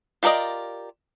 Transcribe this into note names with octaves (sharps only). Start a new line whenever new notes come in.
F4 G4 A#4 D5 D#5